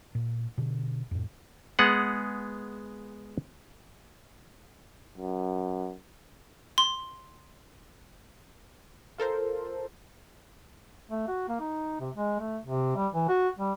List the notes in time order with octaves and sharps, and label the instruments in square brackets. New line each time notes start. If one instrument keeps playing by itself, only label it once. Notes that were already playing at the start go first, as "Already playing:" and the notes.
[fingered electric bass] A#2
B2 D3
F2 A2
[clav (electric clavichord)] G#3 B3 G#4 F#5
[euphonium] F#2
[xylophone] C6
[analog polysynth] F4 A4 A#4 C5
[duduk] A3
F#4
A#3
D#4
C3
G#3
A3
C3
G3
E3
F#4
G3